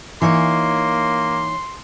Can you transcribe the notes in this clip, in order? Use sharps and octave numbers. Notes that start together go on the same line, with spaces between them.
E3 A#3 D#4 C#5 C6